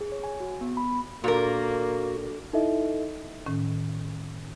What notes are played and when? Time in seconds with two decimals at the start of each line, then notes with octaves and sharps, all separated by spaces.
0.01 G#4
0.12 C#5
0.24 G#5
0.40 F#4
0.61 B3
0.77 B5
1.24 A#2 A#3 D4 F#4 A4 A#4
2.53 D#4 E4 A4 D#5 E5
3.46 A2 D#3 C#4